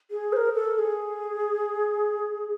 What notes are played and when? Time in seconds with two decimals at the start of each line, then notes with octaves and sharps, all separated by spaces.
0.11 G#4
0.33 C5
0.37 A#4
0.53 A4
0.74 A4
0.79 G#4